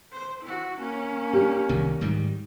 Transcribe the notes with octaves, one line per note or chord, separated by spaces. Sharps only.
C5
E4 F#4
A#3 C#4
D4 G4
C2 D#3
G#2 D#3 G3